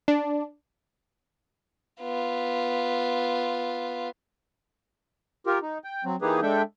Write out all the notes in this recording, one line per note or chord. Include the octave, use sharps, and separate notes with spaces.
D4
B3 F4
F4 G4 A#4
D#4
G5
F#3 C4
E3 A#3 D#4 G4 G#4 B4
G#3 D4 A4 E5 G5